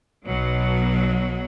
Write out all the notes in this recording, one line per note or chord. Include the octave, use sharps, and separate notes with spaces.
B1 B2 F#3